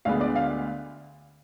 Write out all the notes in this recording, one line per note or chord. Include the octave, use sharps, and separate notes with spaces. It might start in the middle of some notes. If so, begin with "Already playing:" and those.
D2 D3 G#3 B3 F5
D5
F5